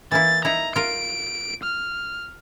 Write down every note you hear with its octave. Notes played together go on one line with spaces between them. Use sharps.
E3 A#3 E4 A6
D#4 E4 A#5
F4 A#4 D7
F6